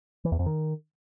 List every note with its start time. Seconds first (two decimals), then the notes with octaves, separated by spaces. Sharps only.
0.25 E3
0.32 E2
0.39 F2
0.46 D#3